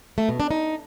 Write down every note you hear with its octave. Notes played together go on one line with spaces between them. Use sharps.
A3
B2
D4
D#4